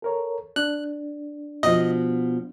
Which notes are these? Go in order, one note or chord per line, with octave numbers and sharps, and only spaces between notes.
A4 A#4 C#5
D4 F#6
B2 F3 D#5